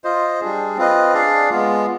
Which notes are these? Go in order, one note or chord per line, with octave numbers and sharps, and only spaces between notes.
F4 C5 D#5
G3 D4 G#4
C4 F4 B4 D#5
D4 G#4 D5 F5
G#3 B3 F4